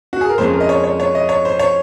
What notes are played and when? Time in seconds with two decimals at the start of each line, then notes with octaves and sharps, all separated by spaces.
0.13 F#4
0.21 G#4
0.30 A#4
0.38 F2 C#3 G#3 C#4 C5
0.53 A#4
0.60 D#5
0.69 C#5
0.84 C#5
1.00 C#5
1.15 D#5
1.29 C#5
1.45 C5
1.59 C#5